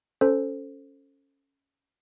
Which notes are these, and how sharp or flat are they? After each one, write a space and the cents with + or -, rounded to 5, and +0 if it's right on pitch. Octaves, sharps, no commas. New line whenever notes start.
C#4 +0 A4 +10 C5 +0